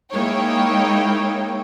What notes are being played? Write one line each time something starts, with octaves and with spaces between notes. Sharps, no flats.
G#3 A#3 D#4 E4 C#5 G5